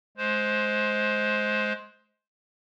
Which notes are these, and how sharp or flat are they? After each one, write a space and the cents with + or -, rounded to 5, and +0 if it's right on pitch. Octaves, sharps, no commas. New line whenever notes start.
G#3 +25 C5 +0